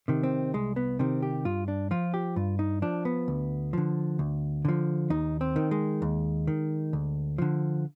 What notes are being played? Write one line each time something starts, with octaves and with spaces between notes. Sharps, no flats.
C3 D#3
C4
C2 G#3
B3
C3 D#3 C4
G4
G2 F4
D4
F3 F4
G4
G2 F4
D#4
F3 D4
B3
D2
D3 F3
D2
D3 F3
D#2 D#4
C4
D#3
G#3
D#2
D#3
D2
D3 F3